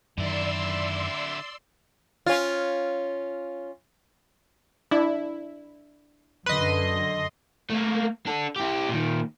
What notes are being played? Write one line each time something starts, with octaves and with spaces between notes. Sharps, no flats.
F#2 D3 D#3 E4 D5 C6 E6
C#4 F4
D4 E4
F#2 D3 B4 D#5 C6
A3 A#3
D4 A4
E4 G4
A#2 D#3